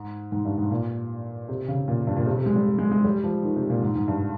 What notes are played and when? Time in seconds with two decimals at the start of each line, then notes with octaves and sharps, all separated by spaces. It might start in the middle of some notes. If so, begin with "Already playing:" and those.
Already playing: G#2
0.32 G#2
0.45 G2
0.58 G#2
0.71 A#2
1.49 C3
1.68 C#3
1.88 A#2
2.07 G2
2.16 A#2
2.26 C3
2.37 C3
2.46 G#3
2.56 G3
2.78 G#3
2.91 G#3
3.04 G3
3.24 F3
3.44 D#3
3.56 C3
3.70 A#2
3.82 G#2
3.95 G#2
4.08 G2